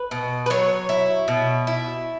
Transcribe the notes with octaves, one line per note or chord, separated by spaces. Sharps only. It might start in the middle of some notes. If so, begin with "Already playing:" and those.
Already playing: B4
B2
B4
F#3 C#5
E4
B2
E4